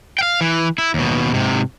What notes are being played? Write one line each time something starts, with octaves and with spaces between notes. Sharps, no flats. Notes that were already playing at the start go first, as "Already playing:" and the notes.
F5 G5
E3
E4
D#2 B2
G#2 C3